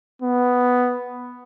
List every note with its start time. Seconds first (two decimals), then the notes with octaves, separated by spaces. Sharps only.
0.22 B3